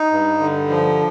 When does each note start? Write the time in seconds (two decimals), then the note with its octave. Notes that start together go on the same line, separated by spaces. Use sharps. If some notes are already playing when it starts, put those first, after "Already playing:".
Already playing: D#4
0.12 G2
0.40 D3
0.70 F3